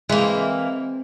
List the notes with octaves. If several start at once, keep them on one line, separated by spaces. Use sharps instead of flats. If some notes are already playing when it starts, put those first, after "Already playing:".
E3 G#3 A#3 C4 E5